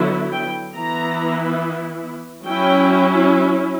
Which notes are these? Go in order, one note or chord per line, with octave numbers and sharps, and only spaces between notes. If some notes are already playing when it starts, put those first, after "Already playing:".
Already playing: D3 F#3 B3 E4
G5
E3 B3 E4 A#5
F#3 C#4 E4 G5